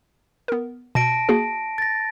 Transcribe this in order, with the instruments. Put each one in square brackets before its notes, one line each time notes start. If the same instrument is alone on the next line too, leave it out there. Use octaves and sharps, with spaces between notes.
[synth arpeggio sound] B3 A#4
[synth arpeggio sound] B2 [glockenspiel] A5 A#6 D7
[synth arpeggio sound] A#3 F#4 G#4
[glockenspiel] A6 A#6